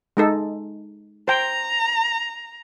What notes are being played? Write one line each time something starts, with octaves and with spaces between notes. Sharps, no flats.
G#3 D#4 A4
C5 G5 A#5